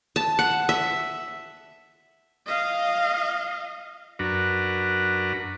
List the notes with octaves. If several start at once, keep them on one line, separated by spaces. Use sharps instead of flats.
A5
F#5
E5
D#5 F5
F#2 D4 F#4 A#4 B4